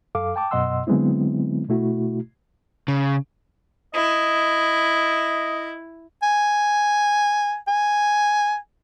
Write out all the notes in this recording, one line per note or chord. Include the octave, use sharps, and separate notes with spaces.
F#2 A4 F5 D6
G5 A5 D6
F#2 B2 D#5 F#5 C6 E6
D3 F#3 G#3 B3 C4 E4
B2 A3 E4 F#4
C#3
E4 D#5
G#5
G#5